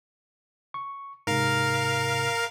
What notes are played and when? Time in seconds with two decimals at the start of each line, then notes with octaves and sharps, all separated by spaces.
0.74 C#6
1.27 G#2 C3 A#4 F5